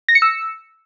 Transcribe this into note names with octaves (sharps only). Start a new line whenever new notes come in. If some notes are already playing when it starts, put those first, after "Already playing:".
A#6
C#7
E6